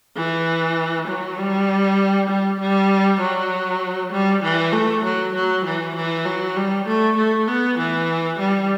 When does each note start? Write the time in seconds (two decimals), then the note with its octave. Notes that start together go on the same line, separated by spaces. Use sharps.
0.16 E3
1.08 F#3
1.37 G3
2.29 G3
2.60 G3
3.21 F#3
4.13 G3
4.43 E3
4.73 A3
5.04 F#3
5.34 F#3
5.65 E3
5.96 E3
6.25 F#3
6.56 G3
6.87 A3
7.17 A3
7.48 B3
7.78 E3
8.39 G3